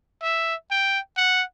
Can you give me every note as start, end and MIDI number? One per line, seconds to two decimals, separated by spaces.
0.22 0.55 76
0.71 0.99 79
1.17 1.43 78